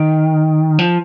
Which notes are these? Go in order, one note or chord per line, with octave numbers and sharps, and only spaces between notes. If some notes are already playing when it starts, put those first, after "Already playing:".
Already playing: D#3
F3